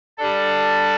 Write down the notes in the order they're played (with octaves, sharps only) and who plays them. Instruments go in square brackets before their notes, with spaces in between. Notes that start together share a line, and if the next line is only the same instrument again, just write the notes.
[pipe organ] G3 D4 A4